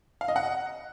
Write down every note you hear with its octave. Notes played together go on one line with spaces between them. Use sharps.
F5
D#5
F#5